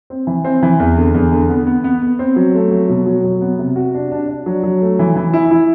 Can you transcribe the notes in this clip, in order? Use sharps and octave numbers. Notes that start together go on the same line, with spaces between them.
C4
E3
C4
E3
E2
D3
E2
D3
B3
B3
B3
B3
C4
F#3
A3
F#3
B2
F#3
F#3
B3
C3
F#4
D4
D4
D4
F#3
F#3
A3
E3
E3
E4
E4